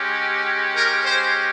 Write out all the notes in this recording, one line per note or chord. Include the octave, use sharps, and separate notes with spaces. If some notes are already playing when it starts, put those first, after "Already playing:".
Already playing: G#3 C#4 G4
A#4
C5